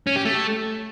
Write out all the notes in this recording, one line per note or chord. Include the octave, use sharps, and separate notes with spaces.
C#4
G4
A3